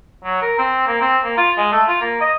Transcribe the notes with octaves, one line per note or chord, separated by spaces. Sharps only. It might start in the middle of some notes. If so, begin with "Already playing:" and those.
F#3
A#4
C4
A#3
C4
A#3
F4
G#3
A3
F4
A#3
D#5